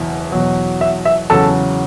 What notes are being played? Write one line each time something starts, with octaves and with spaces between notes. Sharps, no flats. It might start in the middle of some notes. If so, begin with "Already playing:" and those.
Already playing: F#1 E2 B2
E2 B2 F#3
E5
E5
E2 C#3 F#3 A4 A5